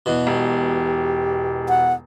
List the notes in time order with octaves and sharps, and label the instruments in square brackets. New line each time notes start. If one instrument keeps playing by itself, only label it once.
[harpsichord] E2 B2
[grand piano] E1 [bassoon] G4
[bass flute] F#5